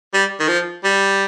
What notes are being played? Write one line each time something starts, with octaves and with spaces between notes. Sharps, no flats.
G3
D#3
F3
G3